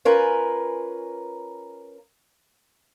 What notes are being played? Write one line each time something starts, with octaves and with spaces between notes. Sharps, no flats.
C#4 F4 A#4 B4 G#5